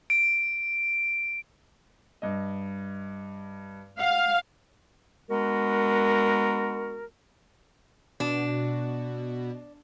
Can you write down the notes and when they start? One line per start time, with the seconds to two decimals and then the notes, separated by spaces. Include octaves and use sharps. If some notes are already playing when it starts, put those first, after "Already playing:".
0.10 D7
2.22 G2 D#5
3.99 F5 F#5
5.30 G#3 B3 D4 F#4 A#4
8.20 B2 D4